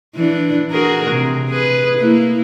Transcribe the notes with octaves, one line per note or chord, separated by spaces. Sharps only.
E3 D4
F#4 G#4 A#4
C3
G#4 B4
A#3 E4